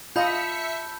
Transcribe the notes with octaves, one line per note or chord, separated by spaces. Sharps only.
F4 D#5 E5 A5 B5 G6 B6 C#7